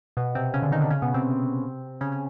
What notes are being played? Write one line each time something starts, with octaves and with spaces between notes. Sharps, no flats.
B2 B3
C3 C4
C#3 C#4
D3 D4
D#3 D#4
D3 D4
C#3 C#4
B2 B3
C3 C4
C#3 C#4
C#4